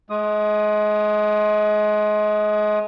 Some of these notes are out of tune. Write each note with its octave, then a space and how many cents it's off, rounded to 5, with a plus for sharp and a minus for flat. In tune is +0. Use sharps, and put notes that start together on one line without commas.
G#3 +30 D#6 +0